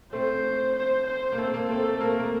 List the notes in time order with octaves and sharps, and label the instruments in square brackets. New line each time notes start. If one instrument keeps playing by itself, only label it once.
[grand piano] A3 C4 [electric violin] C5
[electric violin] C5
C5
[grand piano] A#3
[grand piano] A3 C4 [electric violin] A4
[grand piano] A#3
[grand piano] A3 C4 [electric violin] A4
[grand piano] A3
[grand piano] A#3 [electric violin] A#4
[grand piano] A3
A#3